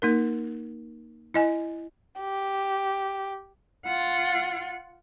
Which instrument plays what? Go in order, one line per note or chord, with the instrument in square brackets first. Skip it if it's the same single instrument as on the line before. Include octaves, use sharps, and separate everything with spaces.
[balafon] A#3 D#4 A#4
E4 D#5 G#5
[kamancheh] G4
[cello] F4 F#5